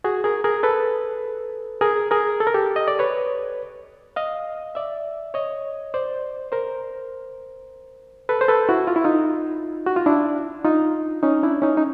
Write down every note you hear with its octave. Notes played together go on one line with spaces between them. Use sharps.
F#4 G#4
G#4 A#4
G#4 A#4
A4 B4
G#4 A#4
G#4 A#4
A4
A#4
G4 A4
D#5
D5
B4 C#5
D#5 F5
D5 E5
C#5 D#5
C5 D5
A#4 C5
A4 B4
C5
A4 B4
E4 F#4
F4
E4
D#4 F4
F#4
F4
D4 E4
D#4 F4
C#4 D#4
D4 E4
C#4 D#4
D#4